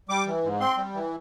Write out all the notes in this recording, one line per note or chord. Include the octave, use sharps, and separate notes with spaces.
G3 D6
E3
G#2
C4 C6
G3
E3